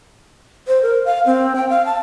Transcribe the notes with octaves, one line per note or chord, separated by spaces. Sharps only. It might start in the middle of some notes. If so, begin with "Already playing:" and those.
C5
A#4
F5
C4
G5
F5
A5